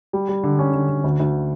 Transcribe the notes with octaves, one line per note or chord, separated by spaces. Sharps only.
G3
G3
D3
C#4
D3
D3
D2
D2